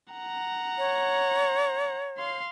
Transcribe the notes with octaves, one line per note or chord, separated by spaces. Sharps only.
F#5 A#5
C#5
F5 C6